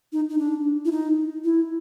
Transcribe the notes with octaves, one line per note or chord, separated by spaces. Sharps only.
D#4
D#4
D4
E4
D#4
E4